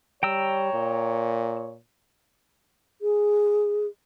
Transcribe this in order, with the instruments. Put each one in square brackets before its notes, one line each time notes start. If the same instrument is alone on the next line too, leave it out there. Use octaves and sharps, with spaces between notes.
[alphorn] G3 [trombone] C#5 [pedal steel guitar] G5 A#5 E6
[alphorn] A#2
[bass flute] G#4